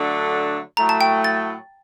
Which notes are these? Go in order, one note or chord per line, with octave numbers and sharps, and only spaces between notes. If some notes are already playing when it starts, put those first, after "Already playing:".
Already playing: D3 F#3 A3 D4
A2 F#3 A3 A#5
A5
G5
A6